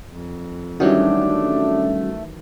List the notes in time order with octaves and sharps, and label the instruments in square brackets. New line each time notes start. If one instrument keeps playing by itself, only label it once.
[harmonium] F2
[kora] D#3 E3 F#3 [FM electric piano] G3 C#4 F#4 [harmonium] A3 [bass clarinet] D4